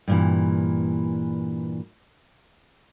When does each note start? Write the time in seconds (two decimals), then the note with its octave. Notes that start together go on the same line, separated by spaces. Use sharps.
0.08 G2 A#2 E3